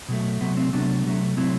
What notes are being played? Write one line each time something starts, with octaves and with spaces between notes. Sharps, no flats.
B2 F#3 A3
C3 F#3 A3 B3
C4
C3 F#3 A3 B3 D4
C3 F#3 A3
C3 F#3 A3 C4 E4